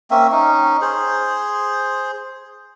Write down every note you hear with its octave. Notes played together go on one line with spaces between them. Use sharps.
A#3 C4 C#4 E5
C#4 D#4
G#4 C5